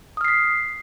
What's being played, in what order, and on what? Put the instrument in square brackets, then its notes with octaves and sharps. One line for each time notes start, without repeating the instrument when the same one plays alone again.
[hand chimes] D#6
F6
C7
B6